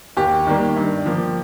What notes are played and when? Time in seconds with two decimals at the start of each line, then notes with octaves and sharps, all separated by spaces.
0.17 D#2 G4
0.46 D#3 G3 A#3
0.76 G2
1.06 F3 A#3